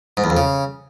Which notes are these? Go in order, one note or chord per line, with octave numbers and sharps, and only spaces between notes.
G#2
E2
F2
C#3